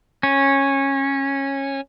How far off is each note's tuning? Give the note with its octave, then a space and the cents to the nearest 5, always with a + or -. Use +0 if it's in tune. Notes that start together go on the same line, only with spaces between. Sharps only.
C#4 -15